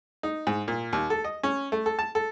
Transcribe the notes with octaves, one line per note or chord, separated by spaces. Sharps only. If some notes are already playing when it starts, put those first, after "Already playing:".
D#4
G#2
A#2
D#2
A4
D#5
C#4
A3
A4
A5
A4